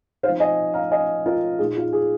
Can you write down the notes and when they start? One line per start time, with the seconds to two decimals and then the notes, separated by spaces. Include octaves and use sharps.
0.23 F3 C4 D#4 C5 F5
0.40 D#5 G#5
0.74 F5 A#5
0.91 D#5 G#5
1.26 F4 A#4
1.59 A#2 A#3 D#4 G#4
1.77 F4
1.93 G#4